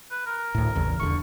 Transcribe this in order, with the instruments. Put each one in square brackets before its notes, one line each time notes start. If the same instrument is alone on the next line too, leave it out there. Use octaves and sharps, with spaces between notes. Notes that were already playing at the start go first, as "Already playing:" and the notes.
[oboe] B4
A#4
[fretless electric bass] D2 A2
A1 E2 C#3
[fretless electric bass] D#1 E2 D3 [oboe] C#6